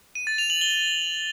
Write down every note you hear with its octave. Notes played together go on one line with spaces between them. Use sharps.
D#7
A6
F7
F#7
G7